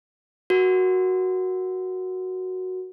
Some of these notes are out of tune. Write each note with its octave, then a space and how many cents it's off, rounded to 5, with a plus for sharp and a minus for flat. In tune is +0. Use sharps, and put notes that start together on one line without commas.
F#4 +0 A#4 +20